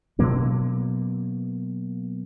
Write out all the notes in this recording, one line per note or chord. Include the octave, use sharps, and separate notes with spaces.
B2 F#3 A#3 C#4